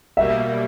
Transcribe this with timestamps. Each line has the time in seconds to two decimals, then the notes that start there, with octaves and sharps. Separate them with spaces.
0.17 B2 G3 A#3 E5